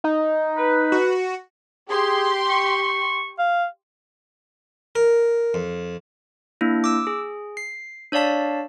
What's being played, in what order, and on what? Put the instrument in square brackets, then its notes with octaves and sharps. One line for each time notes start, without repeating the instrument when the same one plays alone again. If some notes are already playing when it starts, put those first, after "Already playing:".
[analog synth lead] D#4
[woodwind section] B4
[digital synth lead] F#4
[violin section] G4 C6 [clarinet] G#4
[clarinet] C#6
F5
[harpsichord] A#4
F2
[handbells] A#3 D4 E4
D6 E6
G#4
C7
D4 C#5 D5 F5 A5 B6